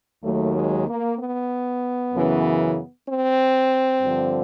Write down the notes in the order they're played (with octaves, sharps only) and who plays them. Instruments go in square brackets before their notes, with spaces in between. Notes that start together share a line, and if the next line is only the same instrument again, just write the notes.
[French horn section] D#2 D#3 F#3 A3
G#3
A#3
B3
F#2 C#3 E3
C4
G2 D3 F3